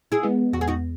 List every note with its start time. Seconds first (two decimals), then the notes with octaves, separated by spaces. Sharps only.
0.12 E4 G#4
0.23 G#3 B3
0.53 E2 F#4
0.61 G#4
0.68 D#4 F#4